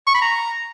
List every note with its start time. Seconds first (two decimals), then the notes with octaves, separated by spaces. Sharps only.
0.07 C#6
0.14 B5
0.22 A#5